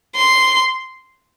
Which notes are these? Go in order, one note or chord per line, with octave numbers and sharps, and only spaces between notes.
C6